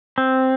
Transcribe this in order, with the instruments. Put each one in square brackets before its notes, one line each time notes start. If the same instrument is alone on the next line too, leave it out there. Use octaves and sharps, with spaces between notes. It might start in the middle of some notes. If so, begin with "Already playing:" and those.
[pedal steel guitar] C4